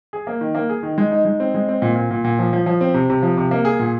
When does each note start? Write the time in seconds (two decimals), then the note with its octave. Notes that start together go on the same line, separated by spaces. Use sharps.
0.13 G#4
0.27 A#3
0.41 D#3
0.55 A#3
0.70 G#4
0.83 D#3
0.98 G#3
1.11 D#4
1.25 G#3
1.40 C4
1.55 G#3
1.68 C4
1.82 A#2
1.96 A#2
2.11 A#2
2.24 A#2
2.39 F3
2.53 F3
2.66 F3
2.81 C4
2.94 C3
3.10 C3
3.22 F3
3.37 C3
3.51 A#3
3.65 G#4
3.79 A#2